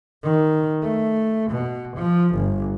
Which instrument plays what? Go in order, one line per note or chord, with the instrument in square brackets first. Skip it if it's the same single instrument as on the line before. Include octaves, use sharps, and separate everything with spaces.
[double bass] D#3
A3
B2
F3
G1